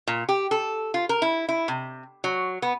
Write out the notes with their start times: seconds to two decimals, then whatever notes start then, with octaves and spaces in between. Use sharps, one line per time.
0.07 A#2
0.29 G4
0.51 A4
0.94 F4
1.09 A#4
1.22 E4
1.49 E4
1.68 C3
2.24 F#3
2.62 B3